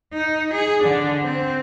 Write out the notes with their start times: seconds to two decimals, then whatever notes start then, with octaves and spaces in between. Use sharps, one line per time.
0.14 D#4
0.54 G#4
0.83 D3 D4
1.23 C4